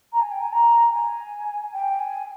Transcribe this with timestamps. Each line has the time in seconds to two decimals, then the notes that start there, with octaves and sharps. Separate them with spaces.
0.12 A#5
0.21 G#5
0.31 G5
0.41 G#5
0.52 A#5
0.92 G#5
1.73 G5
1.99 G#5